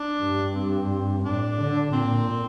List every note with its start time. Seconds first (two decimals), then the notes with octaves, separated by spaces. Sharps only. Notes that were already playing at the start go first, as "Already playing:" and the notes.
Already playing: D4
0.21 G2
0.55 C4
1.24 A2 D4
1.59 D3
1.93 A#2 C4